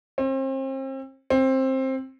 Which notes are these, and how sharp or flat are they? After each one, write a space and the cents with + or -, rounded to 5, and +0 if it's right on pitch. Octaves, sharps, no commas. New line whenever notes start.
C4 +35
C4 +15